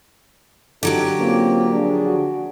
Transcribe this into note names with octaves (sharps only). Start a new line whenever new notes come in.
D3 F#3 C#4 D#4 G4 A4
A#3 C4 C#4 F4
F3 D4 G#4
F#4